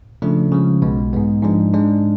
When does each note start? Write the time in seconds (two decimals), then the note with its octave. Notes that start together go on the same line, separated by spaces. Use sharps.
0.22 C#3 F3 A3 D4
0.52 C#3 F3 G#3
0.82 B1 B2 G#3 B3
1.13 G#2 G#3 B3
1.43 G#2 F3 G#3 D4
1.73 G#2 G#3 D4